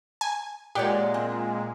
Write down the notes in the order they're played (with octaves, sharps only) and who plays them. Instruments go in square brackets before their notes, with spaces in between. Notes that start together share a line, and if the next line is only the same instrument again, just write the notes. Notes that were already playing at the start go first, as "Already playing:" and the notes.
[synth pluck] G#5
[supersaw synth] A#2 G#3 [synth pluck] G4 [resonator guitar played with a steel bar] C#5 D5 F#5
[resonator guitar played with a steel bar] C4